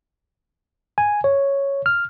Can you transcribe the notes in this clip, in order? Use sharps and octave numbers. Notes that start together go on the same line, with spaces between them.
G#5
C#5
F6